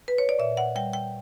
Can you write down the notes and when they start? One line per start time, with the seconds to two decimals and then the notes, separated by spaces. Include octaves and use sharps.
0.08 B4
0.18 C#5
0.29 D5
0.39 A#2 E5
0.57 F#5
0.76 G3 G5
0.93 G5